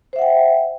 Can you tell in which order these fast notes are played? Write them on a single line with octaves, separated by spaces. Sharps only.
C5 E5 F#5 G5